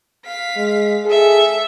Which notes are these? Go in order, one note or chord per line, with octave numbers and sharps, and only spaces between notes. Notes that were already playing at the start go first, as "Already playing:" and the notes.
F5 B6
G#3
G#4 A4 E5